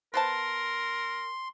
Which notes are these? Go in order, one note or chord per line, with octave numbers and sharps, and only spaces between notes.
B3 A#4 C5 A5 C6